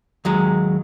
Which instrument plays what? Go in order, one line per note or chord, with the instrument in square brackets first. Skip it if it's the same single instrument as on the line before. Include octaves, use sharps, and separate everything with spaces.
[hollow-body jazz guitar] D#2 F#3 G#3